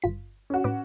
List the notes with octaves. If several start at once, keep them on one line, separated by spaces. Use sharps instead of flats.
G1 F4 B6
C#4 F#4
A2 B4 D6